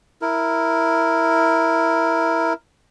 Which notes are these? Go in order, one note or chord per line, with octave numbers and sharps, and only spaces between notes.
E4 A#4